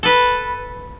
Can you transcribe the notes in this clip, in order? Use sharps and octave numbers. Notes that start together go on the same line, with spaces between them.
A4 B4